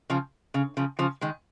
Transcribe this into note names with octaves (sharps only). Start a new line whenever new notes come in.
C#3 F3
C#3
C#3 F3
C#3 F3
D#3 G#3